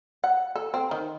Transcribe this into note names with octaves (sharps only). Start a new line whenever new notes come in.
F#5
A4
C4
D#3